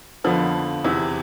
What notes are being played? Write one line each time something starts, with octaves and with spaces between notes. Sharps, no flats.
F2 D3 F3 B3
E2 C3 E3